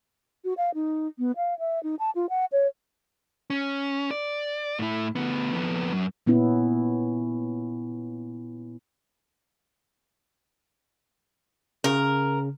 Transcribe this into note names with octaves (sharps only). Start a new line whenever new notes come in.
F#4
F5
D#4
B3
F5
E5
D#4
A5
F4
F#5
C#5
C#4
D5
A2 E4
D2 B3
F2 B3
F#2
A#2 B3 C#4 E4
C#3 A#4